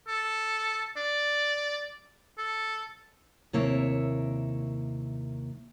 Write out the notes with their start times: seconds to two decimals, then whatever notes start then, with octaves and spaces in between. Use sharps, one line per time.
0.08 A4
0.97 D5
2.38 A4
3.53 D#2 C3 A#3 E4 C#5 E5